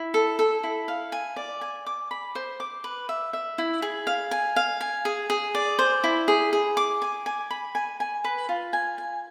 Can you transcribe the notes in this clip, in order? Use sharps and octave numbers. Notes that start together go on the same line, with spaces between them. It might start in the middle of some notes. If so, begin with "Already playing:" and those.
Already playing: E4
A4
A4
E4
F5
G#5
D5
G#5
D6
B5
C5
D6
B4
E5
E5
E4
G#4
F5
G#5
F5
G#5
G#4
G#4
D5
C5
E4
G#4
G#4
D6
G#5
G#5
B5
G#5
G#5
B4
F4
G#5
G#5